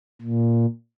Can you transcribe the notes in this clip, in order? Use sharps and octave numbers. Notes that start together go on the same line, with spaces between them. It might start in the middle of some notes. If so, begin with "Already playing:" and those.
A#2